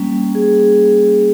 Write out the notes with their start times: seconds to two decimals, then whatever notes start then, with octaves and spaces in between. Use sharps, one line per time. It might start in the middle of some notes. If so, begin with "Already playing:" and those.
Already playing: G3 A#3 C#4
0.35 G#4